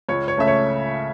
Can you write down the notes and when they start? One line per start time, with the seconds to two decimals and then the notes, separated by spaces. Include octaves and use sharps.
0.09 C#2 C#5
0.28 C#5
0.37 C#3 A3 C#4 E5
0.47 C#5